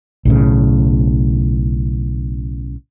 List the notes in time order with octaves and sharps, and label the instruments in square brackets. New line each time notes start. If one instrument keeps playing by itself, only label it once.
[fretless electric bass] B1 A2 C#3